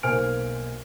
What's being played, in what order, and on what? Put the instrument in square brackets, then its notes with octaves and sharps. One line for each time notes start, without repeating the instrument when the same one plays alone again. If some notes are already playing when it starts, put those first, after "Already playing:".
[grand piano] B1 A#3 C5 G#5 F6 D7